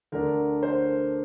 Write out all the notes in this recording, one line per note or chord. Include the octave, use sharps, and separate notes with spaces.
D2 D3 A3 D4 A#4
C5